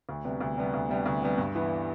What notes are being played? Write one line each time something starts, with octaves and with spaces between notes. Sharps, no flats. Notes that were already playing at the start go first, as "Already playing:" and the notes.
D2
C3 G3 B3
D2
C3 G3 B3
D2
C3 G3 B3
D2
C3 G3 B3
G2
E3 B3 E4